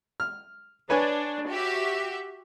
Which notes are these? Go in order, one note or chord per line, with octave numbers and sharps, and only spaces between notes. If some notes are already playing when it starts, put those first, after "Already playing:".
F6
D4 B4 C#5 G#5
F#4 G4 E5